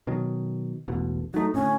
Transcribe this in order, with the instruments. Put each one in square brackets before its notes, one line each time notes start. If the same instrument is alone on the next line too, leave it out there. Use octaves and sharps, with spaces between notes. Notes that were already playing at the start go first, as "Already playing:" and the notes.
[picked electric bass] B2 D#3 F#3
E1 A1 B2
[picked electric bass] F#3 A3 [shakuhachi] D#4
[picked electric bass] A2 D3 [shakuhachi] C#4